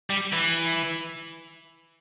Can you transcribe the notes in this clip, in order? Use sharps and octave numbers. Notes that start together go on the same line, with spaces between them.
G3
E3